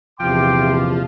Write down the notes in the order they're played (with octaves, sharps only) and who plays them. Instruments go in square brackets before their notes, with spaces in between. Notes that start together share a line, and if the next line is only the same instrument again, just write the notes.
[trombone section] A#1 E2 C3 [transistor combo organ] F3 [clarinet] G5 [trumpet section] C6 D6